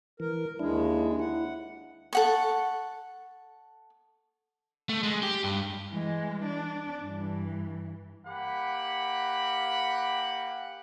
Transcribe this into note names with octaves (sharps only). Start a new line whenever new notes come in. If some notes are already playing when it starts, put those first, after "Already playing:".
E3 A#4
D#2 G#3 D4 E4
E4 F#5
A4 F#5 C#6
A3
G#3
G4
G2
E3 G#3
D4
G2 E3
A#3 G4 F#5 B5